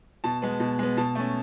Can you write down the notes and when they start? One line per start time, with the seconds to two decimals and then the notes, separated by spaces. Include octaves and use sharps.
0.24 B2 A5
0.42 G#3 B3
0.60 B2
0.79 G#3 B3
0.97 B2 A5
1.15 A3 C#4